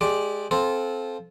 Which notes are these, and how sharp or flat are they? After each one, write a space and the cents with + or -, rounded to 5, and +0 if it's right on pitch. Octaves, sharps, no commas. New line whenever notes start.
G#3 +15 G4 +0 D5 +0
C4 +0 F4 +0 A4 -20